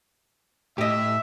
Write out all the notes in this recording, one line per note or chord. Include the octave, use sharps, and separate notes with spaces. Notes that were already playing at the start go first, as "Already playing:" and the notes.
A2 G4 D#5 E5